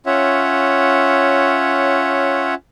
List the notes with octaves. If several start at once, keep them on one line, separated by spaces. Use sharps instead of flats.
C#4 F4 C#5 E5 F#5